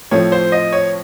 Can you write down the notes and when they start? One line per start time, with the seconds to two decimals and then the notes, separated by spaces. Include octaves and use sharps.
0.11 A2 F3 C4 C#5
0.32 C5
0.52 D#5
0.73 C#5